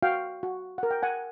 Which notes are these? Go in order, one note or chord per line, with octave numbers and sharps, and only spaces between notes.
F#4 F5 G5
F#4
A#4 F#5
G5
F#5 G#5